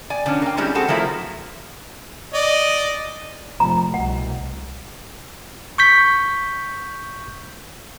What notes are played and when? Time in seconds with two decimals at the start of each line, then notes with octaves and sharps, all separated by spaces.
0.10 D5 G#5
0.26 D3 F3 C#4 D4
0.42 A#3 G5
0.57 G3 G#3 C4 C#4 E4
0.75 G3 C4 F#4 G#4 A4
0.88 D#3 F3 F#3 A3 A#3 E4
2.34 D5 D#5
3.60 F1 F2 F3 A#5
3.94 C2 B2 F#5
5.78 C#6 G6 B6